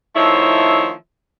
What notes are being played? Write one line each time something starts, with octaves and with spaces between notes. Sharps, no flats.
D#3 F3 A3 C4 E4 C#5